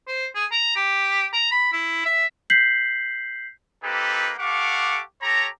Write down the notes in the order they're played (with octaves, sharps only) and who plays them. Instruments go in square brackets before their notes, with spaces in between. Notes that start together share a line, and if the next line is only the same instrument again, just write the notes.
[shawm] C5
G#4
A#5
G4
A#5
B5
E4
E5
[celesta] G6 B6 C7 F#7
[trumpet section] A#3 C4 D#4 G4 A4 B4
G4 A4 F5 F#5 C#6 D6
G4 A4 C#5 A#5